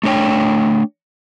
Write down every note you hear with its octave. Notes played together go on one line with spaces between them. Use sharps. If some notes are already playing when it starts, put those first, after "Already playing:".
A3 D4 C#5 G5